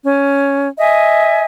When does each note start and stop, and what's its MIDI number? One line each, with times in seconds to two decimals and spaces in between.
0.05 0.68 61
0.78 1.44 75
0.78 1.44 76
0.78 1.44 80